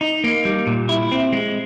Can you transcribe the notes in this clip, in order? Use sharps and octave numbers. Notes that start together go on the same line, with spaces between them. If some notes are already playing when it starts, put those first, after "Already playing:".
D#4
A#3
G3
A#2
E4
C4
G#3